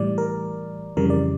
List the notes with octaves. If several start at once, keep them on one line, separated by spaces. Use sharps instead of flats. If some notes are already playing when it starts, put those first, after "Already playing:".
Already playing: A2 E3 G3 D5
A#4
F2 C#3 E3 G3 A#4
D5